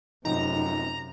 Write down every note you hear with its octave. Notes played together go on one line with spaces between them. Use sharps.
F1 F#2 C3 D#4 A#5